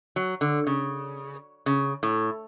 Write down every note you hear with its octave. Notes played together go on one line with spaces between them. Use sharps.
F#3
D3
C#3
C#3
A2